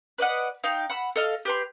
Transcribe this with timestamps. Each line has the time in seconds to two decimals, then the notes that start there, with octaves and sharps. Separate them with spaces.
0.18 B4 D5 D#5 F#5
0.64 D#4 F5 G5
0.90 F#5 B5 E6
1.16 A4 D#5 F5
1.45 G4 B4 C6